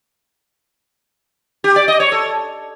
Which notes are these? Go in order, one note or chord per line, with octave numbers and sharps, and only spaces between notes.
G4
D5
D#5
C#5
A4